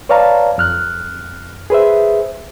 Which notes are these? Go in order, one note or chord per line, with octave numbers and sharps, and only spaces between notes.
B4 C#5 D5 F5 A5 A#5
F2 F6 F#6
G#4 B4 C5 E5